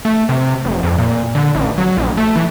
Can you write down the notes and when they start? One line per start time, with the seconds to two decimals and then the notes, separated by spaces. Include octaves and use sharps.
0.05 A3
0.29 C3
0.65 F1
0.83 F2
0.99 A#2
1.35 D3
1.55 A1
1.78 F#3
1.97 A#1
2.17 A3
2.36 E3